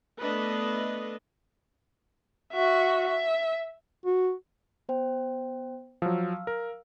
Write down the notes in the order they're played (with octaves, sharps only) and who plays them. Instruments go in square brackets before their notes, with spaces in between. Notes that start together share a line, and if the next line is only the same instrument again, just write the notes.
[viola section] A3 B3 D4 B4 D#5
[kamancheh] F#4 E5
E5
[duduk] F#4
[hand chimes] B3 C5 G5
[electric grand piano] F3 F#3 [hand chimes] F5 E6 F6
[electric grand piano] A#4